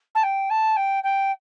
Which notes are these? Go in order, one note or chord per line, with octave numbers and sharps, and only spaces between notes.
A5
G5
A5
G5
G5